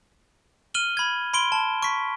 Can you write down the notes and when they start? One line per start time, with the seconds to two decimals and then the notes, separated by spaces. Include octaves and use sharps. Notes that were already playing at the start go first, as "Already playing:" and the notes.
0.74 F6 D#7 F#7 G7
0.97 B5 G#6
1.34 B5 C6 D7 G7
1.52 A5
1.83 C#6 B6